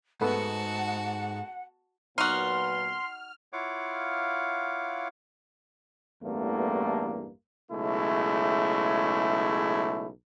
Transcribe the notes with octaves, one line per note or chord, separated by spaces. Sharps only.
G#2 A3 B3 F#4 F#5 A5
A#2 F#3 B3 D#4 F#4 C6 F6
E4 F4 C#5 F5 F#5 D6
A1 E2 G2 A3 A#3
B1 C#3 G#3 A3 E4